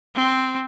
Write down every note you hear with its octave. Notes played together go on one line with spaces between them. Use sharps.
C4